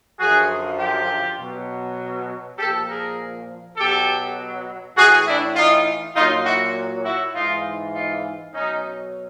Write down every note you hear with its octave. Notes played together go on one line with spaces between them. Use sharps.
F#2 D3 F3 F#4 G#4
F4 G4
B2 F#3
A#2 F3 G4 A4
G#4 A#4
B2 F#3 G4 A4
A2 E3 F#4 G#4
D4 E4
D#4 F4
A#2 F#3 D#4 F4
E4 F#4
E4 F#4
G#2 E3 D#4 F4
D#4 F4
B2 F#3 C#4 D#4